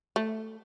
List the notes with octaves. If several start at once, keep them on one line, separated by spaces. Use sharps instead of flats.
A3